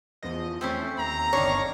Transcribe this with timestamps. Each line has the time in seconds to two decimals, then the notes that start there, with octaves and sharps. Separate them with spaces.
0.23 E2 F3 D#5
0.61 A3 C4 C#4 E4
0.98 D#2 A#5
1.33 G1 D#3 D4 C#5 F5